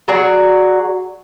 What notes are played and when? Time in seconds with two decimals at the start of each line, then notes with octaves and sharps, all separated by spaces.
0.08 F#3 F#4 G#4 D5